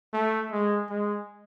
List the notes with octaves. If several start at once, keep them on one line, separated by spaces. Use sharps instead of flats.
A3
G#3
G#3